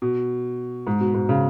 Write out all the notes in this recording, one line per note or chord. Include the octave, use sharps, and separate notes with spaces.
B2
G#2
B2
G#2
C#3